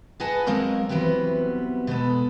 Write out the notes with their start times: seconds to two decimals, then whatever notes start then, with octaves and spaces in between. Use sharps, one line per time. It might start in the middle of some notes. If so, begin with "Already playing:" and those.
0.20 G#4 B4 D#5 F#5 G#5 A5
0.47 F#3 G#3 A#3 C4 A#4 D#5
0.89 E3 F#3 G3 B3 C4
1.87 B2 G#3 B3 A4